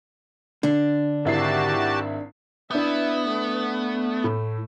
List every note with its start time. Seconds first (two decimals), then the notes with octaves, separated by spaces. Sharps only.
0.63 D3 D4
1.25 G#1 E4 F#4 G4 A5 C7
2.71 B3 D4 E4 E5 D#6 G6
3.28 A3
4.24 A2